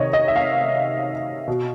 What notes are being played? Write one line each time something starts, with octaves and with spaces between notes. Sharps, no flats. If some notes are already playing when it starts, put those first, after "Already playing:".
Already playing: C3 D#3 C#5 D#5
D#5
E5
F5
B2